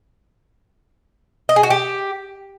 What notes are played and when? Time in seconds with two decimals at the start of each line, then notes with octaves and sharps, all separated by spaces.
1.49 D#5
1.56 G#4
1.63 F#4
1.70 G4